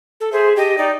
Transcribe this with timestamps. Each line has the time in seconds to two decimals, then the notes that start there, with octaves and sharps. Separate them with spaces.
0.20 A4
0.32 G#4 C5 E5
0.56 G4 D#5 G5 A5
0.78 D#4 D5 G5